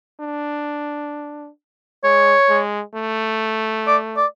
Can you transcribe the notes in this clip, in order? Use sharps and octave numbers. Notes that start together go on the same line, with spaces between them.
D4
G#3 C#5
G#3
A3
D5
D5